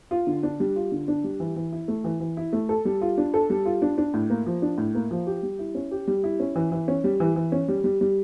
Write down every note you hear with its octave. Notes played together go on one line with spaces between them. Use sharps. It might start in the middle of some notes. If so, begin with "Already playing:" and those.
F4
D3
D4
G3
F4
D3
D4
G3
E3
E3
E4
A3
E3
E3
E4
A3
A4
G3
F4
D4
A4
G3
F4
D4
D4
A2
A#3
F3
D4
A2
A#3
F3
G4
G3
E4
C#4
G4
G3
E4
C#4
E3
E3
C#4
G3
E3
E3
C#4
G3
G3
G3